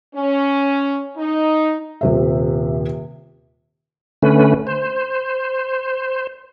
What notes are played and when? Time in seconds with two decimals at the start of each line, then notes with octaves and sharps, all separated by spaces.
0.15 C#4
1.18 D#4
2.01 D#1 C3 E5
4.23 D3 A3 C#4 B4
4.67 C5